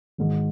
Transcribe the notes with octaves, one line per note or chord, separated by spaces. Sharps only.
G#1 G#2 D#3